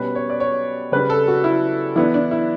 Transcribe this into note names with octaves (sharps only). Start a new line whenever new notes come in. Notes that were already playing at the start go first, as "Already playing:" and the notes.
Already playing: B2 G3 C#4 B4
C#5
D5
C#5
C#3 G3 D4 B4
A4
F#4
E4
E3 B3 D4 E4
D4
E4